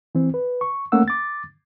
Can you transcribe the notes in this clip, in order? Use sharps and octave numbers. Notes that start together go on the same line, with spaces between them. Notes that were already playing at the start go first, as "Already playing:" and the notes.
E3 C4
B4
C#6
A3 A#3 C#4 F#5 E6
D6 A6